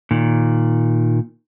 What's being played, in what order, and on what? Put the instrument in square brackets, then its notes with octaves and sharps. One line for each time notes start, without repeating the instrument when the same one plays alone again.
[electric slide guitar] A#2 D#3